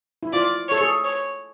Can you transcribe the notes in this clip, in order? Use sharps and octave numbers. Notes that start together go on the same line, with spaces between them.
E4
F4 D5
A4 C#5
G#4
C#5